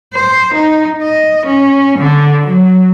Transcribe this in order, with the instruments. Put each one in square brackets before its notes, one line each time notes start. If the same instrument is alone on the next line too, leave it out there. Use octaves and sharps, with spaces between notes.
[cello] C5
D#4
D#5
C#4
D3
F#3